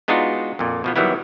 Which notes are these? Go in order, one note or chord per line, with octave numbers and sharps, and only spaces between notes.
G#3 B3 D4 D#4 F4 F#4
F2 A#2
B2 F3 B3
D#3 E3 F#3 G3 B3 E4